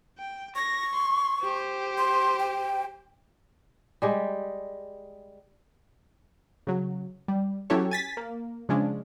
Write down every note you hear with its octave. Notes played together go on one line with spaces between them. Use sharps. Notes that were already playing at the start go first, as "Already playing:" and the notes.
G5
C#6 A#6
C6
G4 C5
C6
G5
G3 G#3 G4
C#3 F#3
G3
F#3 C#4 E4 G4 A4 C#5
G#5 A6 B6
A#3
C#3 F3 G#3 C#4 D4